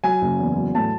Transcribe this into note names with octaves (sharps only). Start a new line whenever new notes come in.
F#3 G#5
F#1
E2
F#3
A2 A5